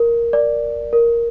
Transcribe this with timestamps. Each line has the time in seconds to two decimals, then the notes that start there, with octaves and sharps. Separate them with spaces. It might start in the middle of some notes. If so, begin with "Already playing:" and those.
Already playing: A#4
0.33 D5
0.93 A#4